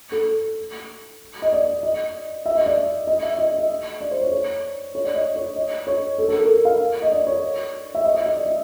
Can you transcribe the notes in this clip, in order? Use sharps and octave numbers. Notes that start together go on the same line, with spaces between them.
A4
D#5
D5
D#5
E5
D#5
D5
D#5
E5
D#5
D#5
D5
C5
C#5
C#5
C#5
D5
D#5
C#5
D#5
C#5
A4
A4
A#4
F5
D#5
D5
C#5
E5
D#5
E5
D#5
D5
D#5